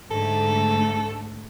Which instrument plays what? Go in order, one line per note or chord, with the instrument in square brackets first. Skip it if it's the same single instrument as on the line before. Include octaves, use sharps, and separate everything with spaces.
[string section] G#2 D3 A3 [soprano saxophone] A4